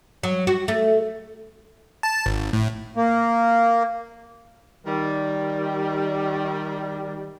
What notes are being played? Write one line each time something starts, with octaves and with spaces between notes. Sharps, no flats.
F#3
F#4
A3
A5
G#1
A2
A#3
D#3 G3